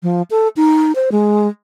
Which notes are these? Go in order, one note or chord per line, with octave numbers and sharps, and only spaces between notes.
F3
A4
D#4
C5
G#3